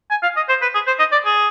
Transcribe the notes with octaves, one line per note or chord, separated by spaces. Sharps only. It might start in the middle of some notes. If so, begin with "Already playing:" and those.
G#5
F5
D#5
C5
B4
G#4
C5
D#5
D5
G#4